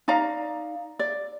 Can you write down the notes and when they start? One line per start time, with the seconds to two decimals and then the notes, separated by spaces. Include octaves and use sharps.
0.08 D#4 D5 F5 A#5
0.99 D5